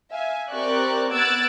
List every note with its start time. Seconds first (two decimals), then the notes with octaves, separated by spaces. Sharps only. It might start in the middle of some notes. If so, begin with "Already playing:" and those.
0.14 E5 F5 G#5
0.51 C4 G4 A#4 D5 C#6 F#6
1.12 B3 E6 F#6 G#6 A6 D7